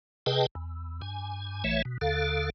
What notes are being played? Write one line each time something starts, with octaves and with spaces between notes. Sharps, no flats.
C3 G#4 B4 D#5 G5 A5
E2
G2 G#5
A#1 E3 A3 C#5 E5
B2
D#2 D3 A4 F5